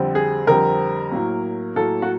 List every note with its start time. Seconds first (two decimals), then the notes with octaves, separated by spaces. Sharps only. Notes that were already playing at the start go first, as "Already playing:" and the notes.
Already playing: F2 D3 G3 C4
0.15 G#4
0.47 F2 D3 G3 C4 A#4
1.11 A2 F#3 A#3
1.76 A2 F#3 A#3 A4
2.02 F#4